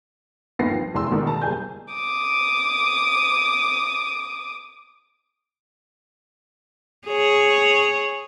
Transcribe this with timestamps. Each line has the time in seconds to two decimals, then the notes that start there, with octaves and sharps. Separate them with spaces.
0.59 G1 D#2 B3 D#4 A#6 C7
0.71 F3
0.94 F1 E2 E3 C6 E6
1.10 C#2 B2 D#3 D5
1.27 A5 A#5
1.41 F#1 G3 G#4 G#5 G6
1.93 D6 D#6
7.07 G#4 C#5